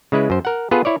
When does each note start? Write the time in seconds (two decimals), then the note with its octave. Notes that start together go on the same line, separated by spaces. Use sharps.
0.12 C#3 G#3 E4 B4
0.30 F#2 C5
0.45 A#4 F#5
0.71 B3 F4 G#4 A4 B4
0.85 E4 C#5 D5